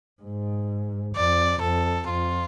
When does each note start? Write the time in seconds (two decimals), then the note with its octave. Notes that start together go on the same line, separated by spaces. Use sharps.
0.22 G#2
1.16 F2 D5
1.62 F2 A4
2.09 F2 F4